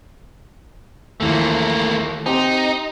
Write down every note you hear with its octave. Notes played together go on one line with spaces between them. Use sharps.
D#2 E3 F3 A3 A#3
C4 D#4 G4